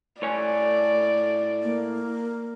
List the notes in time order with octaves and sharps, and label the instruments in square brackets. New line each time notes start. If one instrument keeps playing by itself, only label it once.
[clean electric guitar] A2 C#5 G#5 [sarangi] D5
[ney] A#3